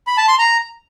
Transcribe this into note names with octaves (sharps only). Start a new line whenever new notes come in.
B5
A5
C6
A#5